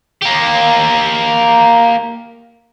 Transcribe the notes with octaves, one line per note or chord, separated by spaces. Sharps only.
A#3 G4